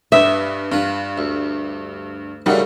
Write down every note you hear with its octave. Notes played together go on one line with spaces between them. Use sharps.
G2 G4 B4 E5 D#6
G2 F4 B4
D2
A#2 C#3 G3 A3 D#4 F#4